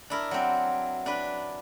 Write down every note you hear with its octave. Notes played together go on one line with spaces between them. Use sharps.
D4 E4 A#4
F#3 C4
D4 B4